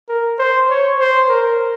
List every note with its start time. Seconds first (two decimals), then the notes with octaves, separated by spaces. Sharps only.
0.09 A#4
0.39 C5
0.70 C#5
1.00 C5
1.29 A#4